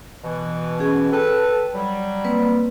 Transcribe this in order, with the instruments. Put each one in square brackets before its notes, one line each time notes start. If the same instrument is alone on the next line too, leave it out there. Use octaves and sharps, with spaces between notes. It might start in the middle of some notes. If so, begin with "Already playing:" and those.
[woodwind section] B2 E3
[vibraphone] C#4 G#4
[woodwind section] A4 B4 [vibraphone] G5
[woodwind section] F#3 G3
[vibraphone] A#3 C4 B4